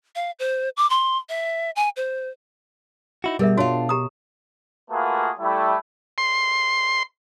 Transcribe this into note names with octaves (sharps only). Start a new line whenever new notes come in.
F5
C5
D6
C6
E5
G#5
C5
D#4 E4 F#4
B2 G3 G#4 A#4 E5
D4 F4 F#4 C#5
G4 A#5 D#6
A3 A#3 F4 F#4 G#4 B4
G3 A3 E4
C6